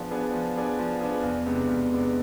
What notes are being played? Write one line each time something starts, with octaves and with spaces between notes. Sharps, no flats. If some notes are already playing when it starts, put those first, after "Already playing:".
Already playing: F3 B3 D4 G#4
B3 D4 G#4
F3
B3 D4 G#4
F3
B3 D4 G#4
E2
C3 G#3 B3 D4
E2
C3 G#3 B3 D4